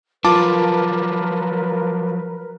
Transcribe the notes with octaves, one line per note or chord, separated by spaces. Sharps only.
F3 F#3 F4 A#4 B4 A5 D6